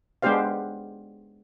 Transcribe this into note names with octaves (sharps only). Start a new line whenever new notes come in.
G#3 B3 D4 G4 C5 F5